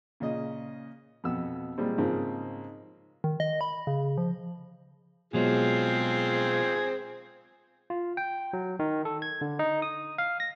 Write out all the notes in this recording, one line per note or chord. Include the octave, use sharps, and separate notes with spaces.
A#2 C#3 D#5
F2 B2 B3 E6
A#2 G3 G#3 C4
G#2 C#3 F3 A#3 C4 D#4
D#3
D#5
B5
C#3
F3
B2 F#3 G#3 C4 F4 G#4
F4
G5
F#3
D#3
A4
G#6
D3
D#4
D#6
F5
A#6